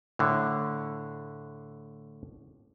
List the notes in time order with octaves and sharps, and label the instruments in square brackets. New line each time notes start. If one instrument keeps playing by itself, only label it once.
[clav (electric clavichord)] A2 D3